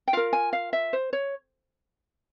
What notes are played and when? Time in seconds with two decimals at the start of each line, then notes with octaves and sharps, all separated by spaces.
0.08 G5
0.13 F4 A#4 F5
0.33 G#5
0.53 F5
0.73 E5
0.93 C5
1.13 C#5